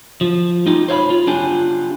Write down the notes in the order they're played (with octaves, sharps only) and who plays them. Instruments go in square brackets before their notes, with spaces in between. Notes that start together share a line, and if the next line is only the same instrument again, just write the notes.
[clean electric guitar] F3
D#4 F4 G4
C5 C#5 E5 B5
F4
D4 F4 G4 G#5